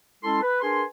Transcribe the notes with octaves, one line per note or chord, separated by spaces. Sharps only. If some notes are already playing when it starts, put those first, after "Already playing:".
G#3 C#4 E4 A4 A5 C6
B4
D4 G#4 A#4 B4 G#5 C6